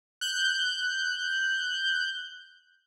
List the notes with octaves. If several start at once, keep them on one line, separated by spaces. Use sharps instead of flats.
F#6 G6